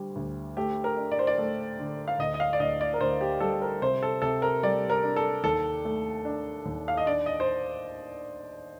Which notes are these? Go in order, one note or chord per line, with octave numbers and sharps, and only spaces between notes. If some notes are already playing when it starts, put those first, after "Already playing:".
Already playing: D2 G3
D2
A3 G4
A#4
D4
D5
C5
D5
A3
D3
F5
D2 D#5
D#5
F5
D5
D2 D#5
D5
A#4
D2 C5
G4
G3 A4
A#4
C3 C5
A4
C3 A4
A#4
G3 D5
A#4
D4
A4
D#2 A4
A3
D4
D#2
F5
D#5
D4 D5
D#5
C5